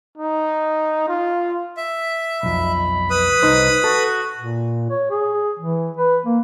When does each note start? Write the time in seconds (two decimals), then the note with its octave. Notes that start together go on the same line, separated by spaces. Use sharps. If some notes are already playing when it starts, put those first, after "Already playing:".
0.18 D#4
1.08 F4
1.77 E5
2.43 B1 F2 B5
3.10 B4 D#6
3.42 C2 D#4 C5
3.84 F#4 A4
4.37 A#2
4.90 C#5
5.11 G#4
5.59 E3
5.97 B4
6.26 A#3